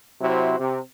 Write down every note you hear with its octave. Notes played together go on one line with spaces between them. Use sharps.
C3 F#3 E4 F#4 C5
C3